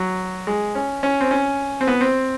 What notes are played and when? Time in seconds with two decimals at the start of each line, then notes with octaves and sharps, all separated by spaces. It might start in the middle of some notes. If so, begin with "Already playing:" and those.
Already playing: F#3
0.47 G#3
0.75 C#4
1.03 C#4
1.21 C4
1.31 C#4
1.81 C4
1.87 B3
2.01 C4